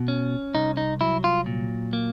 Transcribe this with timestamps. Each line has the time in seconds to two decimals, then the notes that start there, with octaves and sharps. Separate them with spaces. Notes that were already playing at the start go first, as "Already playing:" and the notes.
Already playing: B2
0.08 C#4
0.55 C2 D#4
0.77 D#4
1.01 F#3 E4
1.24 F4
1.46 A#2
1.93 A#3